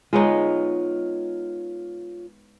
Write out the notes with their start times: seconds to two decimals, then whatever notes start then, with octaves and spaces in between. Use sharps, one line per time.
0.13 G#3 B3 D#4 F4 C#5